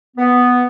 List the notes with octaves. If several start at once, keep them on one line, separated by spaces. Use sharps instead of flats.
B3